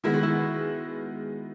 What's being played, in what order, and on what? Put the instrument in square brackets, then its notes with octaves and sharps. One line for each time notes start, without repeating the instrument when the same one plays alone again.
[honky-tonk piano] D#3 G#3 B3 [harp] E4
[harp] F#4
E4